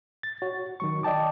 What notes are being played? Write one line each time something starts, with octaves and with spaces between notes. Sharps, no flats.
A6
F#4 C#5
D#3 F#3 C#6
D5 D#5 G5 A5 D6